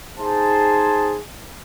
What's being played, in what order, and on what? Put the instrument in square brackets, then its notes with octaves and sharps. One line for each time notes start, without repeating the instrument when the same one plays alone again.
[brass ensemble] D#4 G#4 C5 A5